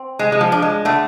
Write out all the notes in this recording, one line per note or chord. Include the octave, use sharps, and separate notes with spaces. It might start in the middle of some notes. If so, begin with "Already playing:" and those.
Already playing: C4
G#3 G#4
G#3
F3
D4
G#3
D3 A3